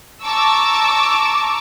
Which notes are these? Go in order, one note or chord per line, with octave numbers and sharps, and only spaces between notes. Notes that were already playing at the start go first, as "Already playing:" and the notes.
A5 A#5 C#6 D6 E6